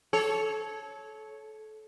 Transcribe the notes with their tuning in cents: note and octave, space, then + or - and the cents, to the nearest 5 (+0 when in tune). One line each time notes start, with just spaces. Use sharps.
A4 -25 C#5 +0